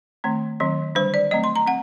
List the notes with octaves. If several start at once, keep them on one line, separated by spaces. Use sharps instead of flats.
D#3 A3 C4
D#3 F#3 C4
D3 G3 D4 C5
D5
F#3 A3 C4 D#5
C6
A#5
C4 F#5